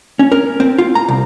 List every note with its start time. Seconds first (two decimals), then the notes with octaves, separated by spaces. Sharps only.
0.19 C#4
0.32 A#4
0.60 C4
0.78 F4
0.95 A#5
1.08 C2